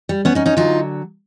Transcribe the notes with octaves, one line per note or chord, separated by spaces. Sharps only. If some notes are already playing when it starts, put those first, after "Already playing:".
G3
B3 C#4
C#4 D#4
C#4 D#4
D3 F#3 D#4 F4